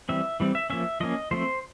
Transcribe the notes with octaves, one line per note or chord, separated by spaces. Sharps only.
E3 G3 C4 E5
E3 G3 C4
E5
F3 A#3 C#4 E5
F3 A#3 C#4 D#5
F3 A3 C4 C5